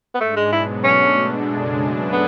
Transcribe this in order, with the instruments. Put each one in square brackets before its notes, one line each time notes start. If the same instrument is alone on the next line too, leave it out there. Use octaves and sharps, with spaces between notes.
[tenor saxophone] B3
[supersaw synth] G#2 G#3 D4 [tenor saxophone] A3
[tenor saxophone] G#3
[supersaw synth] B2 F#3 B3 [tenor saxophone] E4
[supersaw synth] B2 A3 D4 [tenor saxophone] C#4
[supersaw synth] B2 G#3 D4 A4
F#2 C#3 G#3 D4
F#3 A3 D4 G#4 B4
[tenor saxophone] B3